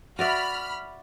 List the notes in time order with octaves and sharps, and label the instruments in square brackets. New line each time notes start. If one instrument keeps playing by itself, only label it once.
[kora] F#4 D5 E5 [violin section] B5 F6